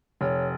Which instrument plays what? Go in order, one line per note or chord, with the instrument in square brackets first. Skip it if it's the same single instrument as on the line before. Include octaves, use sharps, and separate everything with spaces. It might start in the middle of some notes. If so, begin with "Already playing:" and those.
[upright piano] F1 [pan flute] C#5